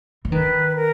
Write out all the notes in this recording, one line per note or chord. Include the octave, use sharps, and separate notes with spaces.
E3
D#3 B4
A#4